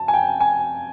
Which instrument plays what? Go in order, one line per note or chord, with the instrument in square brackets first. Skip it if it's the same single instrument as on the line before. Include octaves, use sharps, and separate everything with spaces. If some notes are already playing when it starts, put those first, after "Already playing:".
Already playing: [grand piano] A5
G#5
G5
G#5